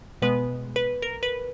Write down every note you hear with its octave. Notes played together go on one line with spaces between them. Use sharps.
B2 G#3 B3 B4
B4
A#4
B4